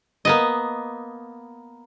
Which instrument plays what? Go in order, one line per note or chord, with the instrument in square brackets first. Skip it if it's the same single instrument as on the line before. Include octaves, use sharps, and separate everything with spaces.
[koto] A#3 B3 D#5